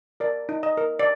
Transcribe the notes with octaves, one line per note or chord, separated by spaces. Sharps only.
A#4 D5
D#4
D#5
A#4
D5